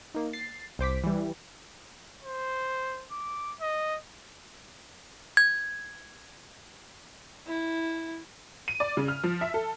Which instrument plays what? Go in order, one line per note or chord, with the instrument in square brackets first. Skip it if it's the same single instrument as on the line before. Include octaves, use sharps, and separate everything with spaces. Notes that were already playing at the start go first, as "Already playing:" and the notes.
[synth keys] A#3 D#4
A6 C7
C2 C5 D6 B6
E3 G3
[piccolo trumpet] C5
D6
D#5
[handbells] G#6
[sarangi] E4
[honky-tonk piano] D#7
D5
C#3
F6
F3
E5
A4